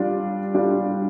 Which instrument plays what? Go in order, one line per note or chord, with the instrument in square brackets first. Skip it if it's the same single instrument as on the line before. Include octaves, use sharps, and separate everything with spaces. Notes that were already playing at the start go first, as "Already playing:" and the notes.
Already playing: [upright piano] G3 D4 F4
G3 D4 F4